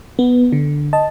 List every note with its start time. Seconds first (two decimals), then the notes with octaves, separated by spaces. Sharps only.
0.19 B3
0.52 D3
0.93 D#5 A5